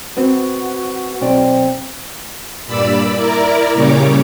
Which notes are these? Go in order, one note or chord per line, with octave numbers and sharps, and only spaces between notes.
B3 C4 F#4
B1 C4 D5
G2 A#2 D5 B5 E6
E4 A#4 D5 A#5
A#2 C#3 G3 C#5 D6